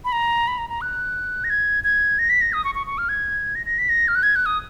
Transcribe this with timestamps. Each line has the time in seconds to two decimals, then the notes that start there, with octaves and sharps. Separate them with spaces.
0.05 B5
0.12 A#5
0.47 B5
0.58 A#5
0.70 A#5
0.81 F#6
1.44 A#6
1.50 G#6
1.84 G#6
2.19 A#6
2.30 B6
2.41 A#6
2.53 D#6
2.64 C#6
2.75 C#6
2.87 C#6
2.98 F6
3.09 G#6
3.55 A#6
3.66 A#6
3.79 B6
3.89 A#6
4.08 F6
4.15 F#6
4.23 G#6
4.36 F#6
4.46 D#6